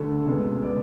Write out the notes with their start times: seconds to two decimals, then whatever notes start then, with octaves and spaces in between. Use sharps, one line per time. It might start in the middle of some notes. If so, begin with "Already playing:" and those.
Already playing: D2 D3 A3 A4
0.25 C#2 B2 G#3 B3
0.63 G#3 B3 D5